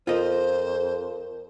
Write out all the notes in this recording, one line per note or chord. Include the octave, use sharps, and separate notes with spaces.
F2 F4 A#4 C5 D#5